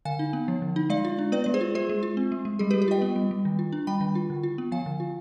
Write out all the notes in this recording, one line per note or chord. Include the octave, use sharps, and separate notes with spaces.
D3 F5 G#5
D#4
B3
F3
D3
D#4
G#3 D5 F5
F4
D4
B3 B4 D5
G#3 D5
G#4 C5
F4
G#3 G#4 C5
G#3
F4
C4
G#3
G#3
G3 G#4
G4 B4
G3
G4 B4
F4 D#5 G5
B3
G3
G3
D#3
F4
D4
G3 G5 B5
D#3
F4
D3
F4
B3
F3 F5 G#5
D3
F4